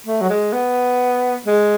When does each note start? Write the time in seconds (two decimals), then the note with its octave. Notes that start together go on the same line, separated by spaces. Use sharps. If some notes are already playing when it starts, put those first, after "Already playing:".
0.07 A3
0.21 F#3
0.30 G#3
0.53 B3
1.46 G#3